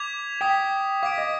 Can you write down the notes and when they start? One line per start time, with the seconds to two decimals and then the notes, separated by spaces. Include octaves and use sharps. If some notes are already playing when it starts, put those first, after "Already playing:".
Already playing: D6 G#6 B6 F7
0.41 G5 D#6 B6 F7
1.03 F5 D6 G#6 B6 D7
1.18 D#5